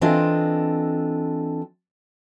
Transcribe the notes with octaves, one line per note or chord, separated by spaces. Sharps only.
E3 C4 D4 F4 A4 D#5